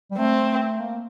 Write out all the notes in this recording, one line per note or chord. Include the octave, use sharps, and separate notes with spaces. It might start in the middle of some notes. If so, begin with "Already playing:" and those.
G3
A3 C4
A#3